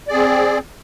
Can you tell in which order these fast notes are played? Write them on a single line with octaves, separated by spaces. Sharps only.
D5 G#4 C4